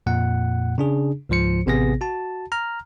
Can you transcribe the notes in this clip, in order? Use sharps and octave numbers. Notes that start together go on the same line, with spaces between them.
F2 A#2 F#5
C#3 D4 G#4
C#2 G#2 F3 C5 C#7
A1 C3 B3 G#4 A#6
F#4 A5
A#5 F6